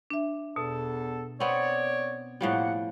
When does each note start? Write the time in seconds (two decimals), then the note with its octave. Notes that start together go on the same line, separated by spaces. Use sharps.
0.10 D4 E5
0.56 E2 B2 A4 A5
1.40 B3 C4 C#5 D5
2.41 A2 F3 G3 A#3 F#5